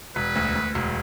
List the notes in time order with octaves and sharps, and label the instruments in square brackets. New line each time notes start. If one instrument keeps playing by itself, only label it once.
[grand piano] E1 [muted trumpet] B4
[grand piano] D2
D2
E1